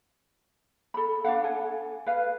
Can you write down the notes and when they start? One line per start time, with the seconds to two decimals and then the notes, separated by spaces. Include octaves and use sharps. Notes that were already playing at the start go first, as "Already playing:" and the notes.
0.94 A4 B5
1.24 D4 D#4 F5 F#5
1.44 A4 G#5
2.06 B4 F5